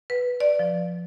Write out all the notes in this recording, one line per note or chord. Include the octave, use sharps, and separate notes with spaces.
B4
D5
F3